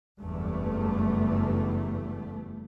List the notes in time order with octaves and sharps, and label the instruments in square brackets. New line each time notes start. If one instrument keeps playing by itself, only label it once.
[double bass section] F#1 E2 G2 A3